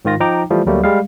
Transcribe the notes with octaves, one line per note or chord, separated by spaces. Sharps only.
G#2 D#3 F4 A#6
F3 D#4 G5 A#5 D6
E3 F3 G3 A3
D2 F#3 G3 A3 A#3
G3 G#3 G#4 F5